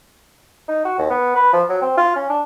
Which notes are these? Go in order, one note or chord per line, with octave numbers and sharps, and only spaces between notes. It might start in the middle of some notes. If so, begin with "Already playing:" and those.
D#4
F#4
D#2
B3
B4
F3
F#3
C4
F4
C#4
D4